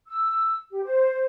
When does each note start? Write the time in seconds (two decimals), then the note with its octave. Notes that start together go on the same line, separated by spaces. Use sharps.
0.08 E6
0.71 G4
0.84 C5